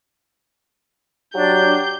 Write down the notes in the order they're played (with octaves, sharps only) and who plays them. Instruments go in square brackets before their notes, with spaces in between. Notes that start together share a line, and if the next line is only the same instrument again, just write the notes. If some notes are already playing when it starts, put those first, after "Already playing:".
[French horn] F#3 [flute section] D4 [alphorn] G4 [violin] G6